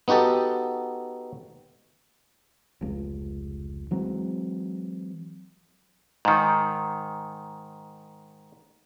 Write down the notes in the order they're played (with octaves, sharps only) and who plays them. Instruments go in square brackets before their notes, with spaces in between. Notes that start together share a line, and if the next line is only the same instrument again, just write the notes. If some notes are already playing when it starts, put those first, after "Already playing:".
[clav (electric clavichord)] B3 D#4 F#4 G4 A4
[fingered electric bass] F1 C#2
E3 F#3 G#3 C4
[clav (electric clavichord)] G#2 D#3